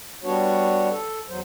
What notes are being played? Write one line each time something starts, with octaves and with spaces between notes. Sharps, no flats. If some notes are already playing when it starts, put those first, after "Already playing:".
G3 B3 D4 F#4 C#5
A4
E2 F#3 C5